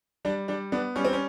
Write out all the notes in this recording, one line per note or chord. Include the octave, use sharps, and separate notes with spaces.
G3 D4
G3 D4
B3 D4
G3 C#4
C4
C#4